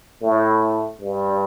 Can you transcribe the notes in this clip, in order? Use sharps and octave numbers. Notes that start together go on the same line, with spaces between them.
A2
G2